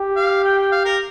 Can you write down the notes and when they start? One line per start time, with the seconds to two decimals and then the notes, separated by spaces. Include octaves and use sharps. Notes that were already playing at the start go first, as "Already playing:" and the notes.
Already playing: G4
0.16 F5
0.44 G5
0.58 G5
0.72 F5
0.85 A#4